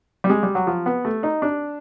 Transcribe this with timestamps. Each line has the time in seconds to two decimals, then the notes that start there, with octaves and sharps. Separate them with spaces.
0.24 G3
0.30 G#3
0.43 G3
0.55 F#3
0.67 F3
0.86 B3
1.05 A3
1.23 D#4
1.42 D4